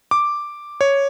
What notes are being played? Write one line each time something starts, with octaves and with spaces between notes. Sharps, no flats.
D6
C#5